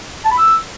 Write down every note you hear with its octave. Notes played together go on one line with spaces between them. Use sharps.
A5
B5
E6